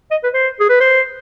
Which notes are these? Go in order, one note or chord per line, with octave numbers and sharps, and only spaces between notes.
D#5
B4
C5
G#4
B4
C5